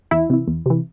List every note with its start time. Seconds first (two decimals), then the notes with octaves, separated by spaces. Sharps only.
0.11 E2 E4
0.30 C3 E3
0.48 E2
0.66 C3 E3